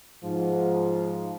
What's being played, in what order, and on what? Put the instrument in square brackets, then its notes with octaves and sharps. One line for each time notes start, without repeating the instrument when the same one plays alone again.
[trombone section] G#2 F3